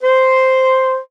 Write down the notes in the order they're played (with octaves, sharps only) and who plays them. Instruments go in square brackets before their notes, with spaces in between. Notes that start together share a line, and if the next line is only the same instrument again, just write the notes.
[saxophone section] C5